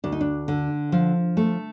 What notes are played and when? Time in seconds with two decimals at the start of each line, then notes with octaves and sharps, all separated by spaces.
0.04 D2 D4
0.12 D#4
0.21 D4
0.48 D3
0.92 F3
1.37 A3